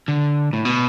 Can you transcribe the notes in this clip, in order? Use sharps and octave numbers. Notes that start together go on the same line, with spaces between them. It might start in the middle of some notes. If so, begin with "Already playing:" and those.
D3
A2
B2